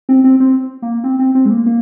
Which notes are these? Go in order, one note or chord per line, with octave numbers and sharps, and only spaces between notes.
C4
C4
C4
A#3
C4
C4
C4
G#3
A#3
A#3